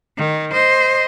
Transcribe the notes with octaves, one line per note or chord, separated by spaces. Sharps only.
D#3
C5 D#5